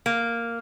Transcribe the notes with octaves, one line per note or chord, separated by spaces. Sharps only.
A#3